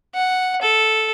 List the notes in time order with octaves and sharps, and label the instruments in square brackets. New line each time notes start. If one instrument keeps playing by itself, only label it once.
[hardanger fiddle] F#5
A4